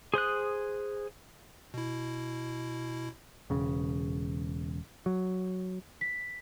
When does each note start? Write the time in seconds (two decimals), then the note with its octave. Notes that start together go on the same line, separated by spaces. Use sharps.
0.14 G#4 C5 D#6 F#6
1.74 B2 E4
3.50 E1 C#3
5.06 F#3
6.01 B6